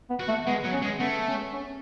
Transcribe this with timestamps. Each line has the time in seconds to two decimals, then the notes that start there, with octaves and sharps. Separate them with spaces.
0.10 B3
0.20 F#4
0.28 A3
0.46 G#3 B3
0.64 F#3
0.73 C#4
0.82 G#3
0.99 A3 B3
1.27 C#4
1.53 C#4